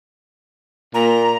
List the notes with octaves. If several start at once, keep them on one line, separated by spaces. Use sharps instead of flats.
A#2 A#5